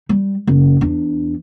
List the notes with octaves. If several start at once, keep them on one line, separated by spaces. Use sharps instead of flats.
G3
F#1
E2 D4